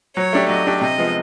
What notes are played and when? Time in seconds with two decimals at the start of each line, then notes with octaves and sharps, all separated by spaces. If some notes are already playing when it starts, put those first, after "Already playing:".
0.17 F#3 C#5
0.33 A3 D4 G4
0.49 F#3 D#5
0.66 A3 D4 G4
0.81 C3 D#5
0.98 F3 G#3 B3